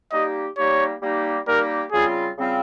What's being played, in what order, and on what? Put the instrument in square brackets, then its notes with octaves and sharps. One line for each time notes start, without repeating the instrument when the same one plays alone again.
[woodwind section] G3 A#3 D#4 G4 [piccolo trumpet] D#5
[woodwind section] G3 A#3 D#4 G4 [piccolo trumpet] C#5
[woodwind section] G3 A#3 D#4 G4
[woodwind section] G3 A#3 D#4 G4 [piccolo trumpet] A#4
[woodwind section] C#3 G3 C4 F4 [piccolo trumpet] G#4
[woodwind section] C#3 G3 C4 F4